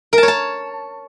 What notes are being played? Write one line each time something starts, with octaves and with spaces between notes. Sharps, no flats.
A#4
A5
C#5
A5